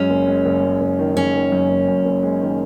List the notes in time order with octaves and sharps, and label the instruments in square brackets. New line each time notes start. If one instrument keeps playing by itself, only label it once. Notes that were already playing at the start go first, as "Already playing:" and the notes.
Already playing: [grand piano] F#2 G#3 [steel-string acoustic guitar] C#4
[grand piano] F#1
G#3
F#1
F#2
F#1
D#3
[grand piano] G#3 [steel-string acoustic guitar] C#4
[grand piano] D#3
F#2
F#1
F#2
F#1
G#3
D#3